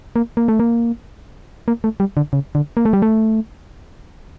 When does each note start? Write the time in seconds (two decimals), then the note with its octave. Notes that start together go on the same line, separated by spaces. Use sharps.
0.16 A#3
0.37 A#3
0.48 A3
0.60 A#3
1.68 A#3
1.84 A3
2.00 G3
2.17 D3
2.33 C#3
2.55 D3
2.77 A#3
2.85 A3
2.93 G3
3.02 A3